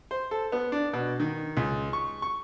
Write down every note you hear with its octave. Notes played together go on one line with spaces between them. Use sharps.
C5
A4
B3
D4
B2
D#3
C#2
C#6
C#6